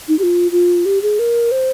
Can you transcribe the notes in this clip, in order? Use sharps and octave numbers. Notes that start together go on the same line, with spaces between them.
D#4
G4
F4
F4
G4
G#4
A#4
C5